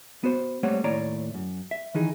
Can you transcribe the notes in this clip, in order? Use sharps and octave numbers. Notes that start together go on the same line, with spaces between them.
B3 F#4 C5
G3 A3 A#3 C4 C#5 F#5
D#2 A2 C#5 D5 A#5
F#2
E5
D#3 E3 D#4 G#4